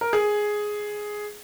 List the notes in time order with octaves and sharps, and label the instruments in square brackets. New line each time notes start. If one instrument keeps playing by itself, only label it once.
[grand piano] A#4
G#4